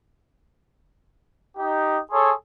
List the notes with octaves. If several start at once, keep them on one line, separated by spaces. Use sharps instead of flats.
D#4 G4
G#4 A4 C#5 C6